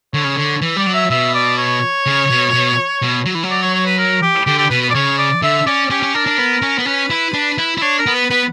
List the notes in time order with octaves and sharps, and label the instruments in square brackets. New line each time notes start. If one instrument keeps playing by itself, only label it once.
[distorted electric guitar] D3 [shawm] C#5
[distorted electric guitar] C#3
[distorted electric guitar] D3 [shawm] C#5
[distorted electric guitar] E3
[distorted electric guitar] G3 [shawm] D5
[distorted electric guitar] F#3
[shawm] E5
[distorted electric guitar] B2 [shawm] E5
[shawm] D5
C#5
[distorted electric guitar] C#3
B2
B2
B2
F#3
E3
F#3
[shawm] D5
C#5
C#5
B4
A#4
G4
[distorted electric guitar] D3 [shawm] G4
[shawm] G4
[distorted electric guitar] B2 [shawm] B4
[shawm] B4
D5
[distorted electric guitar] C#3 [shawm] C#5
[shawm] D5
[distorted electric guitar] D3 [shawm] E5
[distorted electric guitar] C#4 [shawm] D5
[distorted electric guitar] C#4 [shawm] G4
[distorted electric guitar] C#4
[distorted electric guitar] D4 [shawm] A#4
[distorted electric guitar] D4
B3
C#4
B3
[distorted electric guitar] C#4 [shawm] B4
[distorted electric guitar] E4
D4
E4
E4
[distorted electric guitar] D4 [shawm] C#5
[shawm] A#4
[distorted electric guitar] B3
[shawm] B4
[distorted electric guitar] B3 [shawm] B4